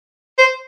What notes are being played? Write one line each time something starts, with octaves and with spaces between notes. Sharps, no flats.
C5